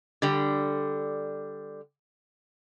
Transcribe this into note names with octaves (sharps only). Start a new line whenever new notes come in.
D3 G3